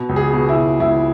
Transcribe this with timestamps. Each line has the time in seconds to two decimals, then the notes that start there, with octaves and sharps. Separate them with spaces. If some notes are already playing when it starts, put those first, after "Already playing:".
Already playing: B2
0.09 C#2
0.16 G#4
0.33 B2
0.49 E4
0.56 B2
0.80 C#2 E4